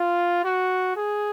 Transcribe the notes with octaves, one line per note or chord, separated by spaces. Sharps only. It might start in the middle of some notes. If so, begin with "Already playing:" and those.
Already playing: F4
F#4
G#4